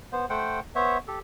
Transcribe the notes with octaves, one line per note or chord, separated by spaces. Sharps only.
B3 C5
A3 C5 F#5 G5
B3 C5 C#5 E5
G4 A4